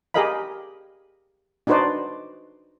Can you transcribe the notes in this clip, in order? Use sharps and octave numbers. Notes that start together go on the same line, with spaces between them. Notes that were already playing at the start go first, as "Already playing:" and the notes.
G4 G#4 A#4 D#5 F5 B5
D4 D#4 F#4 B4 C5 D5